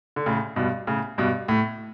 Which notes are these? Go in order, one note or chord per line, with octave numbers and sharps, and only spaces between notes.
D3
A2 C#3
G2 B2
A2 C#3
G2 B2
A2